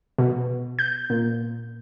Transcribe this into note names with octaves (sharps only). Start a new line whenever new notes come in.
B2
G6
A#2